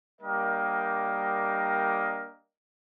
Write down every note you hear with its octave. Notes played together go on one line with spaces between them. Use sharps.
G3 A#3 D4 A#4 D#5 G5